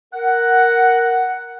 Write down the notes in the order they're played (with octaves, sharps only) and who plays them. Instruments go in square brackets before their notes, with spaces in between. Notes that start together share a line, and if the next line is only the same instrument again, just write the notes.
[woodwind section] A#4 F#5